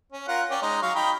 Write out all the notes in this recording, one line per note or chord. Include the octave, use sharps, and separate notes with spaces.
C#4
F4 A#4 F#5
C#4 D5 G5
G#3 D#4
F#3 F5 C#6
D#4 G5 B5